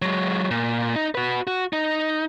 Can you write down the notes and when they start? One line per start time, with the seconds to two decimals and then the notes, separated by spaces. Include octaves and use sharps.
0.02 F#3 G#3
0.51 A#2
0.96 D#4
1.15 F#4 B4
1.47 F#4
1.73 D#4